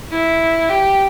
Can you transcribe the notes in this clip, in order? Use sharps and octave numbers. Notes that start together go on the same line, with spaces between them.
E4
G4